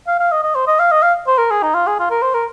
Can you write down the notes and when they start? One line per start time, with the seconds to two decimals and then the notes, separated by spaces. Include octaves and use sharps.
0.07 F5
0.20 F5
0.31 D#5
0.43 D#5
0.55 C5
0.67 D#5
0.79 F5
0.91 D#5
1.02 F5
1.27 C5
1.38 A#4
1.51 G#4
1.63 D#4
1.74 F4
1.87 G#4
1.99 F4
2.10 A#4
2.22 C5
2.34 A#4